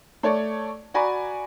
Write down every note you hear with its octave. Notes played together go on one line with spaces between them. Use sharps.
A3 C#5 D5
F#4 D5 G#5 A#5 B5